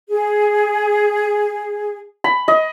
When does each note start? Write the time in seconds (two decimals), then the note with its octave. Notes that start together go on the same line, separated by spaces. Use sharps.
0.10 G#4
2.24 B5
2.48 D#5